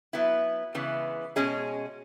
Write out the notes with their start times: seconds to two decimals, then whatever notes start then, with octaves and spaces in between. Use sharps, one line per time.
0.13 F#3 B3 E4
0.75 C#3 E3 G#3 B3
1.36 B2 G#3 C#4 G#4 D#5